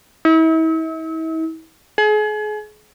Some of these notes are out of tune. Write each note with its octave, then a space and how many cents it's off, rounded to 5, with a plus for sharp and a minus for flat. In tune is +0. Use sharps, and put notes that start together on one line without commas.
E4 -40
G#4 +35